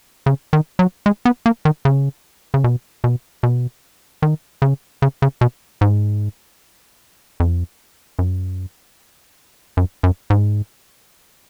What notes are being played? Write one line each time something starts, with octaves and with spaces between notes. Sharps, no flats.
C#3
D#3
F#3
G#3
B3
A#3
D#3
C#3
C#3
B2
B2
B2
D#3
C#3
C#3
C#3
B2
G#2
F2
F#2
F#2
F#2
G#2